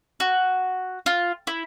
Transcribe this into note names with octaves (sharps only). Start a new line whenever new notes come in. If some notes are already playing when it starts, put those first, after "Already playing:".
F#4
F4
E4